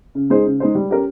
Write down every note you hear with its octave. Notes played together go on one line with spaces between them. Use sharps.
C#3
G#3 D#4 G#4 C5
C#3
G#3 D#4 G#4 C5
G3
C#4 G4 A#4